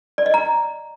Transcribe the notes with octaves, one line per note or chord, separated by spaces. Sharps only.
D5
D#5
A#5